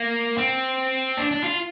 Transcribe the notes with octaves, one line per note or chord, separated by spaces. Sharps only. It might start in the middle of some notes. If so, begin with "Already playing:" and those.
Already playing: A#3
C4
D4
D4
F4